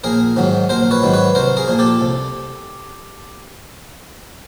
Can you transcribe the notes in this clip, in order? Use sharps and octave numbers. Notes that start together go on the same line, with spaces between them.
A#1 G#4 A#4
G#2 D#3 F#3
A#1 A#4 C5
B4 C#5
G#2 D#3 F#3
B4 C#5
C2 A#4 C5
G#4 A#4
A#2 F3
G4 A4
C2